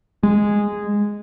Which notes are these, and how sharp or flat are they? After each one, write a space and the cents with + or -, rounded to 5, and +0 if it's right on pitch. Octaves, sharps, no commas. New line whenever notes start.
G#3 -10